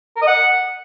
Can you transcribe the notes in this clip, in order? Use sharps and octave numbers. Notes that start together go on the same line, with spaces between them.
A#4
D#5
F#5